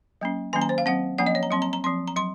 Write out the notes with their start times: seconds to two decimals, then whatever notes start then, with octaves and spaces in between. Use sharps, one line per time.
0.21 F#3 A#3 C#4
0.53 D#3 F#3 A#3 C#4 G#5
0.62 A#5
0.69 C5
0.78 F5
0.86 F#3 C4 F#5
1.18 F3 A#3 C#4 F#5
1.27 D#5
1.35 C#5
1.43 A#5
1.51 F#3 C4 C6
1.62 A#5
1.73 A#5
1.84 F3 C4 C6
2.08 A#5
2.16 F#3 C6